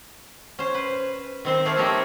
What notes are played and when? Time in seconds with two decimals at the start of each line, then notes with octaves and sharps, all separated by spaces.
0.59 C#4 C5
0.74 B4
1.45 D#3 C4 C5
1.66 A3 G#4 D5 F5
1.77 F3 A#3 C4 D#4 G4 C#5